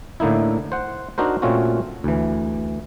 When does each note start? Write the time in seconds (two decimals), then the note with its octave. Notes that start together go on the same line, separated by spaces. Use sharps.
0.20 A2 D3 A#3 D#4 E4
0.72 C5 F#5
1.18 D4 D#4 F#4 A#4 C5
1.42 A#2 A3 C4 C#4 F4 F#4
2.04 D2 E3